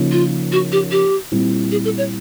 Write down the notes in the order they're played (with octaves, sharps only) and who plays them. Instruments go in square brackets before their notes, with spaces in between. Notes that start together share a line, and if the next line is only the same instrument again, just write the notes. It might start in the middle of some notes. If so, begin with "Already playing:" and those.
Already playing: [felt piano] C#3 F3 A#3 D#4
[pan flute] F4
F#4
G4
G4
[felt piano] A#2 G3 C4 E4
[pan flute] G#4
A4
C#5